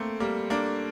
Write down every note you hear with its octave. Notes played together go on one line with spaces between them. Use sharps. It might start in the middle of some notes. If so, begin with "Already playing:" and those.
Already playing: A3 A#3 C4
G3 A#3
A#3 D4